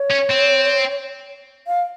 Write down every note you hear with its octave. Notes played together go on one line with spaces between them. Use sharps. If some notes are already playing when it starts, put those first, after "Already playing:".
Already playing: C#5
C#4
C4
F5